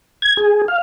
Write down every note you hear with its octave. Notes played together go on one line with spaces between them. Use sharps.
G#6
G#4
F5